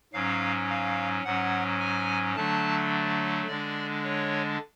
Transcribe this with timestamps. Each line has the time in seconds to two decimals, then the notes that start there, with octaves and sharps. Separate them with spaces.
0.13 G#2 F#3 C#4 F5
0.69 F5
1.24 G#2 F#3 C#4 F#5
1.80 G#5
2.36 D3 F#3 A3 D4 A5
3.47 D3 G#3 D4 D5
4.04 C#5